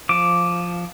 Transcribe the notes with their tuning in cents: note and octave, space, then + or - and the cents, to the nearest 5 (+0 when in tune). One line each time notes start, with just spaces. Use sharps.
F3 +0 D6 +0